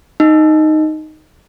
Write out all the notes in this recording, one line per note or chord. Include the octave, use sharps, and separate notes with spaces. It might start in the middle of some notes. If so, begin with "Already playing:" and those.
D#4